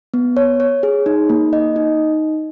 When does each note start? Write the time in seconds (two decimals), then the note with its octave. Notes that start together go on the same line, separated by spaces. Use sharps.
0.14 B3
0.37 C#5
0.60 C#5
0.83 G#4
1.06 D#4
1.29 A#3
1.53 D#5
1.76 D#4